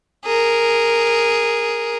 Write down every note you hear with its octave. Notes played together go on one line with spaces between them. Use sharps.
G#4 A#4